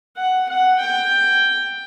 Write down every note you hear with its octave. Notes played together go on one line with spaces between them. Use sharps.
F#5
F#5
G5